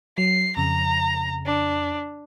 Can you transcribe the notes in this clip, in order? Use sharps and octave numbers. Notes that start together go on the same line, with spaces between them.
F#3 C7
F2 C#3 A#5
D4